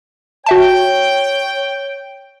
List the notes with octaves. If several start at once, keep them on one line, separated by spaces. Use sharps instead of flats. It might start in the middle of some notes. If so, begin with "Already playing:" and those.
F#4 C#5 E5 G5 A5